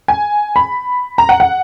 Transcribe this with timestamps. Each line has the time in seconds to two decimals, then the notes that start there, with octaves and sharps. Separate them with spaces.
0.08 G#5
0.56 B5
1.18 A#5
1.29 F#5
1.40 F#5